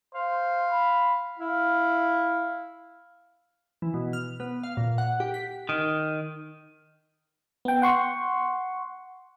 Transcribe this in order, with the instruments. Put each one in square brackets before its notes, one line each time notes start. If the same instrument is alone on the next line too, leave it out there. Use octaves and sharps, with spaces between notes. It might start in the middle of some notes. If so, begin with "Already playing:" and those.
[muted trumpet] C5 [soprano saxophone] F5
[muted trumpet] B5
[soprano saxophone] E4 [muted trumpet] F5
[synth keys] E3
B2
F6
B3
F5
A#2
F#5
G4
B6
[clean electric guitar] D#3
[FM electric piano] B3 G5
F#5 C6 C#6